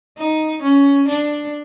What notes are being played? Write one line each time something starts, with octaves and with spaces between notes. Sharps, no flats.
D#4
C#4
D4